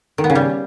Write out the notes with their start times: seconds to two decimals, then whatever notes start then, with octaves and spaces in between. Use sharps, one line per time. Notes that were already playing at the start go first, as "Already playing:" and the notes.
0.18 D#3
0.24 B3
0.30 C#3
0.35 G3